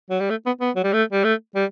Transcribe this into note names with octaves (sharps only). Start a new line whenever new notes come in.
F#3
G3
A3
B3
B3
F#3
G3
A3
G3
A3
G3